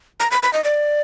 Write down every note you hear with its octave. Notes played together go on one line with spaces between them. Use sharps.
A#5
B5
B5
D#5
D5